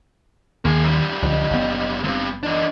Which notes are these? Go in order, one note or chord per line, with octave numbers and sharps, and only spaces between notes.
D#2 D#3 A#3 G#4
F#2 G3
C#2 D3 F3 D#5
F#1 B3
C#2 G2 C4
E3 D4 D#5